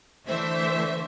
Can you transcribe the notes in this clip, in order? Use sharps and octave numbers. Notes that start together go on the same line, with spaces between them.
D3 E3 A3 C5 E5